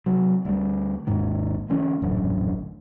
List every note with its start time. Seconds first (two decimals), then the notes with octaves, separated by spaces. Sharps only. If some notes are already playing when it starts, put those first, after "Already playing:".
0.06 C3 F#3
0.45 D2 G3
1.07 G#1 D#2 G#2 D#3
1.69 D3 E3 A3 C#4
2.02 D#1 A1 F#2 D3